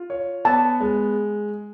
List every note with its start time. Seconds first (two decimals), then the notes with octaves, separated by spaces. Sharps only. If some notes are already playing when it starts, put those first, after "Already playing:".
Already playing: F4
0.10 C#5
0.45 B3 A5
0.80 G#3